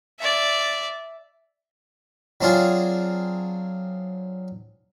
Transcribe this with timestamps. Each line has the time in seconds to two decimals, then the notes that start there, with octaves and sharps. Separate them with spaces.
0.20 D5 E5
2.41 F#3 C4 D4 F4 G#4